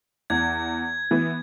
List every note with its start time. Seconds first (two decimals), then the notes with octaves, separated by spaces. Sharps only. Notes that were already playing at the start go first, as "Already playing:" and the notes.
0.30 E2 G#6
1.11 E3 B3